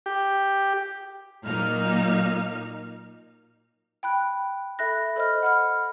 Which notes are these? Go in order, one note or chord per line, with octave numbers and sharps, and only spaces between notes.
G4
A#2 F#3 A#3 D#4 F6
G5 B5 F#6
A4 E5 B5 F#6 A#6
A4 C5 D#5 B5 F6
F#5 B5 F6